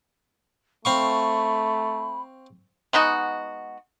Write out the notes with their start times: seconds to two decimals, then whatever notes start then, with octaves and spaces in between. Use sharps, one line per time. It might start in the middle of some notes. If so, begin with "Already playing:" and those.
0.85 A3 C4 F5 B5 C#6
2.93 G#3 B3 D#4 F#4